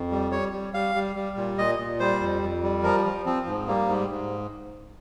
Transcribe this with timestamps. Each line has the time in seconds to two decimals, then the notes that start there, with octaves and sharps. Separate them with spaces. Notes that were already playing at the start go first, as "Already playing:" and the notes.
Already playing: F2
0.11 G3
0.32 G3 C#5
0.53 G3
0.74 G3 F5
0.95 G3
1.16 G3
1.37 A#2
1.58 A#2 D#5
1.79 A#2
1.99 G3 C5
2.21 F2
2.42 F2
2.63 G3
2.83 F3 A#4
3.05 F3
3.26 F3 C4
3.47 G#2
3.68 G3 A#3
3.88 G#2
4.10 G#2